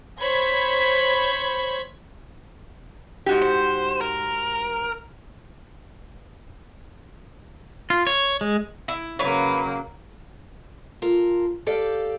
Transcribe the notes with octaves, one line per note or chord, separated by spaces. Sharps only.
C5 C#5 B5 G#6 B6
G#2 F#4 G4
C5
A#4
F4
C#5
G#3
E4
C#3 F#3 A#3 B4 C#5
F4 A4 A#4
G4 A4 D5 F5 G5